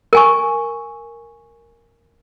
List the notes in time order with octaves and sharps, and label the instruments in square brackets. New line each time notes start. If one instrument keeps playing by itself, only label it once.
[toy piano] A#4 G#5 C#6